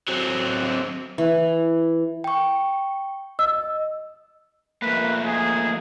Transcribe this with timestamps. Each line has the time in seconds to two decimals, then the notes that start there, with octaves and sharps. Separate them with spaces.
0.08 F#3 C4
1.18 E3
2.24 G5 C#6
3.39 D#5 E6
4.82 F3 A3 A#3 B4
5.25 G#4